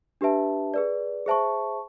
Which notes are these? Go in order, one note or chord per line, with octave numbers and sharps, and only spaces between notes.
D4 G4 B4 E5 A5
G#4 B4 D5
G#4 C5 E5 A5 C#6